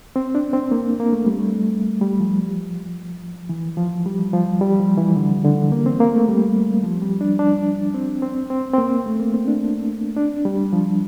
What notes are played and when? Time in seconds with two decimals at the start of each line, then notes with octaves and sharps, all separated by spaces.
0.16 C4
0.35 D4
0.53 C4
0.71 A#3
1.00 A#3
1.13 A3
1.26 G3
1.39 A3
2.01 G3
2.20 F3
3.49 E3
3.77 F3
4.06 G3
4.33 F3
4.61 G3
4.80 F3
4.98 E3
5.16 D3
5.44 D3
5.72 A#3
5.86 C4
6.00 A#3
6.14 A3
6.28 G3
6.84 F3
7.02 G3
7.21 D4
7.39 D4
7.94 C4
8.22 C4
8.50 C4
8.74 C4
8.78 A#3
9.06 A3
9.19 A#3
9.34 C4
9.48 D4
10.16 D4
10.45 G3
10.73 F3